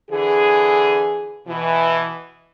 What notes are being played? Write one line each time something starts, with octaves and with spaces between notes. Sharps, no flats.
D3 E3 G#4
B2 E3